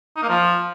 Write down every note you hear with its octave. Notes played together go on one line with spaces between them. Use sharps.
D#4
A#3
F3